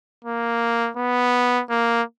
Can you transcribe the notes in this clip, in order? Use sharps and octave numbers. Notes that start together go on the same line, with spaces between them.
A#3
B3
A#3